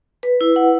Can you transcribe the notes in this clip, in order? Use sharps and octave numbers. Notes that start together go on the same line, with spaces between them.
B4
E4
F#5